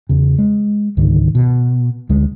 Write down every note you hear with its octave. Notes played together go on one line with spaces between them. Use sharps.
E2 C#3
G#3
C#2 G#2 D3 D#3
B2
D2 D3 G#3